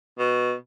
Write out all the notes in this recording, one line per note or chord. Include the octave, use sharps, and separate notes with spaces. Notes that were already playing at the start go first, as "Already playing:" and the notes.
B2